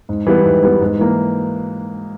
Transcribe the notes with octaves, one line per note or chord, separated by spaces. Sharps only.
G#2
E3 G3 B3
G#2
E3 G3 B3
G#2
E3 A#3